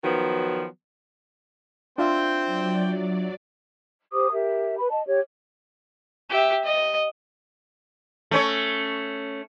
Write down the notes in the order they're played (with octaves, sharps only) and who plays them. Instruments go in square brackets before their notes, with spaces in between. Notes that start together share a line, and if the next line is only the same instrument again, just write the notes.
[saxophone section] D#3 F3 F#3 B3
[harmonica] C4 C5 G5 [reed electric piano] D4 F4 E5
[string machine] F#3 D5
[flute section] G4 C5 D6 D#6
G4 A#4 E5
B4 B5
D#5 A5
G4 C#5
[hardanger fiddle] G4 E5
D#5
[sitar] A3 C#4 C#5